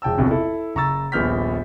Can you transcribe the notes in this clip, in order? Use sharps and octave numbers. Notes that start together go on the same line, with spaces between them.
E1 G5 A5 E6
F#1 B1 F2 C3
E4 A4
F#1 A#5 C#6 E6 A6
D#1 A#1 B3 F6 G6 B6